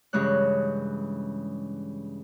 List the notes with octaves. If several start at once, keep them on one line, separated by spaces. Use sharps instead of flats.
G2 C#3 E3 G#3 C#5 F#6